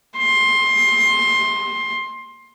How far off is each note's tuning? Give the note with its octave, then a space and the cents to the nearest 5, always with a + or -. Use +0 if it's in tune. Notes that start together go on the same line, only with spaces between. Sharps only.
C6 +20